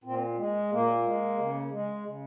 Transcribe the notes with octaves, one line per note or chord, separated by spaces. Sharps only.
A#2 C4
G#3
A#2 A#3
G#3
C#3
G#3
C#3